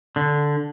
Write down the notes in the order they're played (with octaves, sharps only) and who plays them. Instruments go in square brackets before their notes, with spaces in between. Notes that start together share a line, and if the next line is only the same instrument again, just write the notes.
[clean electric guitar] D3